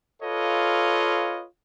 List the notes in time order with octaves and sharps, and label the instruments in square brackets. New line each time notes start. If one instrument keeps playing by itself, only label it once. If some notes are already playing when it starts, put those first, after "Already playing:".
[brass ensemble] F4 A4 B4 C#5 D#5 F5